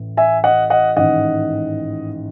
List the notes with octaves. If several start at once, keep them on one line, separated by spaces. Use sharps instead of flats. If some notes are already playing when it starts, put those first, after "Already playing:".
Already playing: A1 A2 E3
E5 G#5
D#5 F#5
D#5 F#5
A1 G#2 D#3 D#5 F#5